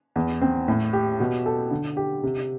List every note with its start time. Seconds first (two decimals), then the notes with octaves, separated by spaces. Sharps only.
0.16 E2
0.41 C4
0.68 A2
0.93 G4
1.20 B2
1.46 A4
1.71 D3
1.97 G4
2.23 C3